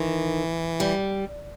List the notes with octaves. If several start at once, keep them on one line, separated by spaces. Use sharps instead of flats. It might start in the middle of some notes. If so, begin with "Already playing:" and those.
Already playing: D#3 E3
G3